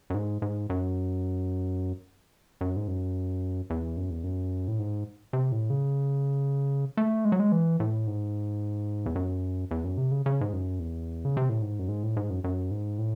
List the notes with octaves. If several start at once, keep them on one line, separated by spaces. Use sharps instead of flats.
F#2
G#2
G#2
F#2
F#2
G#2
F#2
E2
F#2
E2
F#2
A2
G#2
C3
A2
C#3
A3
G#3
F#3
G#3
E3
A2
G#2
E2
F#2
E2
F#2
C3
C#3
C#3
G#2
F#2
E2
C#3
C3
A2
G#2
F#2
G#2
A2
G#2
F#2
F#2
G#2
A2